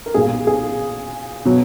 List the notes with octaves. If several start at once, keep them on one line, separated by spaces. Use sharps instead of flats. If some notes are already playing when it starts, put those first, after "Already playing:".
A#4
B1 A#2 G#3 G#4
G#4
B2 F#3